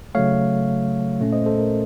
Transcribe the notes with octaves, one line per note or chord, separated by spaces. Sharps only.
C#3 F#3 A3 C#5 F5
A#2 A3 C#4
C5 D#5
A4 C5
A#4